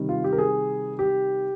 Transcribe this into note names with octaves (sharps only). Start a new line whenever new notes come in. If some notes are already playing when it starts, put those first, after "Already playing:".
Already playing: C3 D#3 G3
F4
G4
A#4
G#4
G4